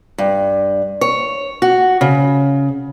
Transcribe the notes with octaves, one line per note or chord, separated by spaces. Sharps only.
G2
C#5
F#4
C#3